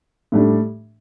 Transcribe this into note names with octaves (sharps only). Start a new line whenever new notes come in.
A2 G3 D4